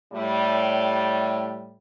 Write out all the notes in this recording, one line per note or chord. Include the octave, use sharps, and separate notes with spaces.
A2 G3